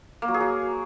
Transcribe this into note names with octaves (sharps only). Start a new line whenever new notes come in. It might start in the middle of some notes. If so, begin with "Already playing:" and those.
A#3
F#3
G#4
F#3